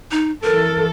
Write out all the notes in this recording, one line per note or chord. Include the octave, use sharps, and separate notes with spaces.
D#4
E3 A4 A#4